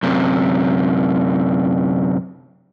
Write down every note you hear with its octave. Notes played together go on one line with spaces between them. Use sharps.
F#2 C3